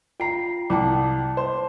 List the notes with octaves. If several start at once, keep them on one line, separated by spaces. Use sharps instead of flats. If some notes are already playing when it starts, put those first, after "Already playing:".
F4 G5 A#5 C7
C2 G5 A5 D6
C5